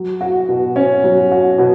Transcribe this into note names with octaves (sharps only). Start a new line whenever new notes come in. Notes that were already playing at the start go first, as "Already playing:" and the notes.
Already playing: F#3
F#4
B2
C#4
F#3
F#4
B2